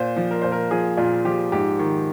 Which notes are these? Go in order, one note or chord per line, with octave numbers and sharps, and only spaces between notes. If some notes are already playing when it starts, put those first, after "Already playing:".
Already playing: A#2 C5
F3
A#4
A#2 C5
A#4
F3 G#4
A#2 F4
F3 G4
G#2 G4
D#3